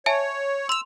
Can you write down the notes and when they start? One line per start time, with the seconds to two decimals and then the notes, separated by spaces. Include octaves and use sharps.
0.06 C#5 E5 G#5 A5
0.69 C6 E6 F7